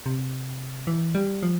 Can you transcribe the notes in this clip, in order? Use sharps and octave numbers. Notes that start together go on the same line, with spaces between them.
C3
E3
G3
F3